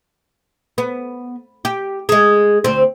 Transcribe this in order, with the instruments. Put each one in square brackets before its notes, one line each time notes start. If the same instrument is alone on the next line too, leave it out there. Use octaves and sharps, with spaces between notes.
[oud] B3
G4
G#3 G#4
D2 C4